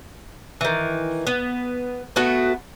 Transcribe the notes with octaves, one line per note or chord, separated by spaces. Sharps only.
D#3 E3
B3
A3 B3 F#4